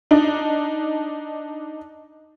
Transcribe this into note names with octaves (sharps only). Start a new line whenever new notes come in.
D4 D#4